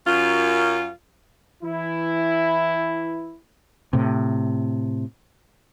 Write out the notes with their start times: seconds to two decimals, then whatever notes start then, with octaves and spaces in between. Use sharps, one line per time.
0.06 F#2 F4
1.64 E3 E4
3.93 A2 C3